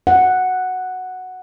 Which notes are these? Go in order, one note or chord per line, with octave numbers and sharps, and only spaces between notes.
F#5